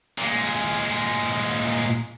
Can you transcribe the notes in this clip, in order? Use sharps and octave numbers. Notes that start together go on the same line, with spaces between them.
A#2 G#3